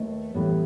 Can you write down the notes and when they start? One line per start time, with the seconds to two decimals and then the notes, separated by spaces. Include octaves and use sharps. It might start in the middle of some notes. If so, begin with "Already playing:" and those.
Already playing: D#2 A3 B4 D#5
0.34 A2 E3 G3 B3